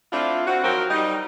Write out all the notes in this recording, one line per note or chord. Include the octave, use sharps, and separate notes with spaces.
A3 C4 D4 E4 F4
C4 F#4
D#3 F3 F#3 C4 F#4 A#4
G3 D#4